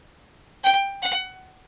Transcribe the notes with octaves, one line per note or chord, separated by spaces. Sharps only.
G5
F#5